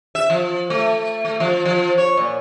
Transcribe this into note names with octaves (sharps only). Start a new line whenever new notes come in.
E5
F3
A3
A3
F3
F3
C#5
A#2